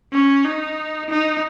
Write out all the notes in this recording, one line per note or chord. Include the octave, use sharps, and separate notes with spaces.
C#4
D#4
D#4